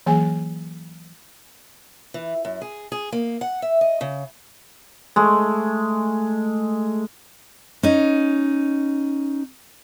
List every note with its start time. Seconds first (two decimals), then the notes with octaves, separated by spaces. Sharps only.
0.06 E3 F#3 A#3 G#4 G#5
2.14 E3
2.45 F#2
2.62 G#4
2.92 G#4
3.12 A#3
3.41 F#5
3.62 E5
3.81 D#5
4.01 C#3
5.16 G#3 A3
7.83 C#4 D#4